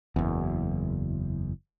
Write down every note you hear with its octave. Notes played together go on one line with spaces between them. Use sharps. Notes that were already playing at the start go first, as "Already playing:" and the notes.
F#1 E2